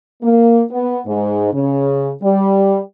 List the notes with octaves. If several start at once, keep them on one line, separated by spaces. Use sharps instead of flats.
A#3
B3
G#2
C#3
G3